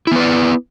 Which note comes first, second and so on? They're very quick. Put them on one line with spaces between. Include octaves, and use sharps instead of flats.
E4 B3 B4 D5